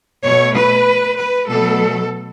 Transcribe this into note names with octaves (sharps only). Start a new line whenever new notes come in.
B2 A3 C#5
B4
B4
B2 F#3 A3 A4